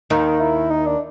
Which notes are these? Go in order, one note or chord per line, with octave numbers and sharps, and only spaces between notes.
D#2 D#3 D#4
E4
D#4
D4